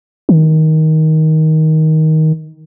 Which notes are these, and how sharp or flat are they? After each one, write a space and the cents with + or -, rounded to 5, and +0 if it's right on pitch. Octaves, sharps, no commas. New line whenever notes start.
D#3 +15